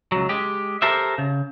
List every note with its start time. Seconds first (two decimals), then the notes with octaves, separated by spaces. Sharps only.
0.12 C#2 F#3
0.29 G#3 G4
0.82 G4 A4 A#4 C5 E5
1.18 C#3